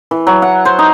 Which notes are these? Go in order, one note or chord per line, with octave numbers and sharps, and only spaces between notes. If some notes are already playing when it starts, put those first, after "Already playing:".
E3
F#3
F#5
C5
D#4